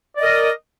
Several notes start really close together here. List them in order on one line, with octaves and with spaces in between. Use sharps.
D5 D#5 A#4